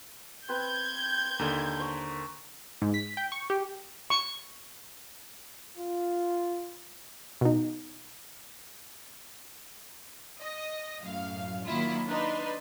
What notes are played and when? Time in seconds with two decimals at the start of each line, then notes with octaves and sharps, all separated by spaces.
0.49 C4 B4 G6 G#6
1.39 D#2 D3 A#4 D#5
1.79 C5 C#6
2.82 G#2
2.94 B6
3.17 G5
3.32 C#6
3.50 G4
4.10 C#6
5.77 F4
7.41 B2 D#4
10.41 D#5
11.01 F#2 A2 F5
11.66 D#3 F#3 A#3 E4 F4
12.08 D4 D#4 B4 C6